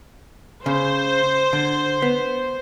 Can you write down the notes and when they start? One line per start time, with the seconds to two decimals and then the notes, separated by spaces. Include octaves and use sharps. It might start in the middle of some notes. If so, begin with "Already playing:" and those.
0.66 C#3 C5
1.53 D3
2.02 B3